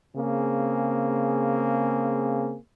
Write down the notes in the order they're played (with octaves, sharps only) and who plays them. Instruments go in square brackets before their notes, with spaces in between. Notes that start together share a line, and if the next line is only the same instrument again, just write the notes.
[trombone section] C#3 A#3 C4 G#4